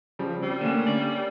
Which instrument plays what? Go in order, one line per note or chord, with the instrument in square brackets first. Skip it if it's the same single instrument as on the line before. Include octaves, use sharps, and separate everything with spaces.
[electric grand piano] C#3 F3 G3
[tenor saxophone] G3 [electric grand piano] C4
[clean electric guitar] D3 A3 [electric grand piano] A#3 C#4
[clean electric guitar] D5